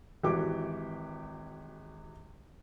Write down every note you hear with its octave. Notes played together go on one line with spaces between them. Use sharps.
G#1 E3 F#4 G4 D6